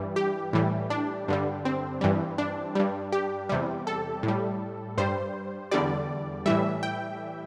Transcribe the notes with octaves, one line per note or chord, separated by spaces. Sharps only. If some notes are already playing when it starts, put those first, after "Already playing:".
Already playing: G2 E3 G3
G4
A2 E3 G3
D4
G2 D3 G3
C4
G2 E3 G3
D4
G2 G3
G4
E2 C3 G3
A4
A2
G3
G2 G3 C5
E2 D3 G3 D5
A2 E3 G3 E5
G5